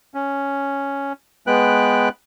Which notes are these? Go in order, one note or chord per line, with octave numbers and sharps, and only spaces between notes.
C#4
G#3 B3 B4 G5 F#6